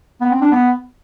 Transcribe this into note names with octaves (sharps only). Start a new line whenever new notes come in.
B3
C4
D4
B3